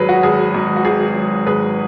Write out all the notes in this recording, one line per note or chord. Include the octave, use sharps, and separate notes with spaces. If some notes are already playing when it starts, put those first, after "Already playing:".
Already playing: G#1 F#3 G#4 B4
F#4
G#1 G#4
G#2
F#4
G#1 G#4
F#3
G#1 G#4 B4